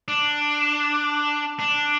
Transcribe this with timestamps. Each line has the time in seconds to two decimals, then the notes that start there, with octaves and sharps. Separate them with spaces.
0.08 D4
1.60 D4